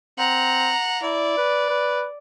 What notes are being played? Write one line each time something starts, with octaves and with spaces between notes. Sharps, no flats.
C4 F#5 A#5
E4 D5
B4
B4